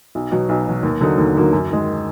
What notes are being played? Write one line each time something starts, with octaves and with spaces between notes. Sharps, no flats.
B1
B2 F#3
B1
B2 F#3
D#2
D3 F#3 A#3 D#4
D#2
D3 F#3 A#3 D#4
F#2
D#3 G#3